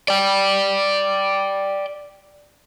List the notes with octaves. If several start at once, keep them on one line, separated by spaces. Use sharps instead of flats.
D5 G5